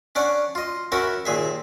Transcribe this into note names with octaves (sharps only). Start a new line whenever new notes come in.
C#4 D4 D5 F#5
F4 D#5
C#4 F#4 A#4 E5 F#5 B5
D#2 A#2 G#4 E5